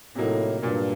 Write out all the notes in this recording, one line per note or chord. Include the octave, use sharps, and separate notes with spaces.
A2 C3 F#3 A#3 D#4
G2 A#2 F#3 A#3